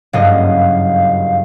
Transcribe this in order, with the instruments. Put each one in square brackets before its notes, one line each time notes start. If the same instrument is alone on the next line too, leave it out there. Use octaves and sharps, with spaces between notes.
[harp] F#1 G2 D#5 [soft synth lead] F5